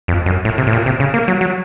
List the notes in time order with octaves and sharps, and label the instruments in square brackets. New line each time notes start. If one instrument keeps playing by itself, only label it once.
[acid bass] F2
F#2
A2
C3
A2
A#2
C3
C#3
A#3
F#3
F#3